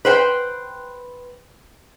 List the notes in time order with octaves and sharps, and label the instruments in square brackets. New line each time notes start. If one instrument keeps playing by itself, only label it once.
[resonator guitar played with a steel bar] B4 C5 G5